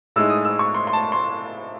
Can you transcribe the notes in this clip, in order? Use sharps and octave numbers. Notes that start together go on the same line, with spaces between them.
A2 G#3 D#4 E6
D#6
E6
C#6
C6
C6
A5
C6